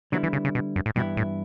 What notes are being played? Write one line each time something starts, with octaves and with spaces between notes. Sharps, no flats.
D3 F#3 G3 B3 E4
E3
C#3
C#3
B2
F#2
A2
G2 B2 E3 B3 E4
A2